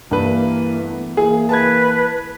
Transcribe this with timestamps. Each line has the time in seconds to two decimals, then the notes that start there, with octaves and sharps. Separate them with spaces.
0.11 G2 E3 A#3 B4
0.79 E3 A3 B3
1.17 E3 A#3 G#4
1.49 B4 A5 G#6